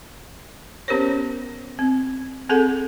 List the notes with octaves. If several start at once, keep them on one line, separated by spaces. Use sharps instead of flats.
B3 C#4 G4 A#4 C5 C#5
C4
C4 G#4 A4 F#5